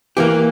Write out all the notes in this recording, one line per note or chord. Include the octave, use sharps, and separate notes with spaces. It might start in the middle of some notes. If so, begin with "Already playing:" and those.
E3 A#3 G4